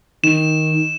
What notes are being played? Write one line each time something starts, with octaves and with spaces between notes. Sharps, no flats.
D#3 E7